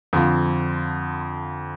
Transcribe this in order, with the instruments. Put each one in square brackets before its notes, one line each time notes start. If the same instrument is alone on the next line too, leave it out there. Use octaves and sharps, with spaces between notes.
[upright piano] F2 D3 F3